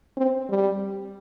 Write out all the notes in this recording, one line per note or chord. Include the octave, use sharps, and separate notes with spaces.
C4
G3